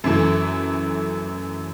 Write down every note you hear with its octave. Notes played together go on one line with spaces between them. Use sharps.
F#2 E3 A3